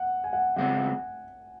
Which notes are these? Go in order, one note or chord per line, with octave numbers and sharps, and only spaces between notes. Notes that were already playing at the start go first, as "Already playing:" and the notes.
Already playing: F#5
G#5
F#5
E2 C#3 G#3 C4 F#5